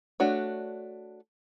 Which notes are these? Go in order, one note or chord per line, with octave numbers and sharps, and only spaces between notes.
A3 D4 F#4 C#5